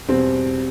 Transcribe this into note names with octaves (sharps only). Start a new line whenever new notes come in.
E2 B2 G3 C4